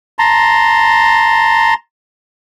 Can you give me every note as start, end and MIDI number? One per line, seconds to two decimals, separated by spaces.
0.19 1.74 81
0.19 1.74 82
0.19 1.74 84